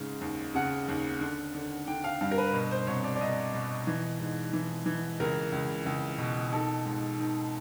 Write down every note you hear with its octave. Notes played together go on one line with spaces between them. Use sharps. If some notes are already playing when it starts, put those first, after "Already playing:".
Already playing: G#2 C#3
D#2
C#3 F#5
D#2
D3
D3
D3 G5
F5
G2 F5
A#4
B4
B2
C5
C2 C#5
D5
D5
C2 D#5
B2
E3
G#2
E3
E3
C#2 A#4
C#2
C#2
B2
D#3 A4
G#2
D#3